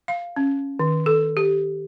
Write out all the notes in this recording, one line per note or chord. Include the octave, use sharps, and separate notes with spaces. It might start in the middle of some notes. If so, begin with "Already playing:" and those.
F5
C#4
D#3
A4
G4